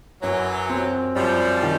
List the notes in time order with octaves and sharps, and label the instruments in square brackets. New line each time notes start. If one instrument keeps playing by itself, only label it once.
[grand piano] F#2 [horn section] E3 F#3
[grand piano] C4
[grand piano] F#2 [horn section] F3 G3
[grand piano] D#3